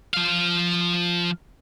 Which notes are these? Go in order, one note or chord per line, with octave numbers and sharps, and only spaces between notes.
F3 F5